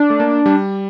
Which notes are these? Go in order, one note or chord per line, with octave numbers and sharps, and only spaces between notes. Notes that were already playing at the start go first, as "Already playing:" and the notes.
Already playing: D4
A3
A#3
G3